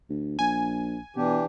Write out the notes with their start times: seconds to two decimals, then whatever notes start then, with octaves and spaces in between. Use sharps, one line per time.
0.09 D2
0.39 A#1 G#5
1.16 B2 E3 D4 G4